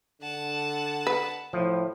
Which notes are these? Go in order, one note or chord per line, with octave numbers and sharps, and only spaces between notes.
D3 F#5 A5
B4
A2 F3